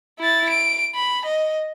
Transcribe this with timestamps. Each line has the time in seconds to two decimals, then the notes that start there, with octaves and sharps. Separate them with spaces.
0.19 E4 A6
0.49 D7
0.95 B5
1.25 D#5